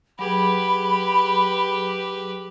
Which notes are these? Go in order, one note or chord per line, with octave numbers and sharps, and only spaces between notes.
F#3 G4 G#4 B4 B5